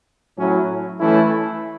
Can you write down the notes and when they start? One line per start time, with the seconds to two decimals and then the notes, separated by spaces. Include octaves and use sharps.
0.37 A2 F#3 C#4 E4
1.00 E3 A3 C#4 E4 A4